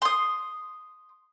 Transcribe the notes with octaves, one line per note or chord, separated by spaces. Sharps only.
C6 D#6